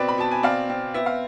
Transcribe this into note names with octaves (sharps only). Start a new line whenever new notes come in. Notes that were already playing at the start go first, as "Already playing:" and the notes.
Already playing: B2 C4 B4 D5
B5
B2 A5
G#5
C4 D5 F5
C4
B3 E5
F5